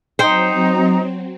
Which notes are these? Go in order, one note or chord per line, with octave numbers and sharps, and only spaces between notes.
F#3 C4 D#4 C5 G5 A#5